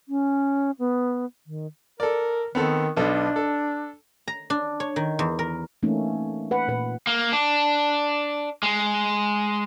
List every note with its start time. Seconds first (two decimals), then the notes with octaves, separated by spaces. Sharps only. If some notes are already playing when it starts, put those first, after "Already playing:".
0.09 C#4
0.79 B3
1.46 D#3
2.00 A4 A#4 D5
2.55 D#3 B3 C4 A4
2.97 B1 B2 D4 A4
3.36 A4
4.28 A#5
4.50 D4
4.80 C#5
4.96 D#3
5.19 E2
5.39 A#4
5.83 E3 A3 A#3 C4 C#4 D#4
6.51 B4 F#5
6.68 A#2 B4
7.07 A#3
7.32 D4
8.63 G#3